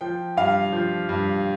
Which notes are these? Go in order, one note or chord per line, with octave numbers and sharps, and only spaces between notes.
F3 G5
G2 F5
F3
G2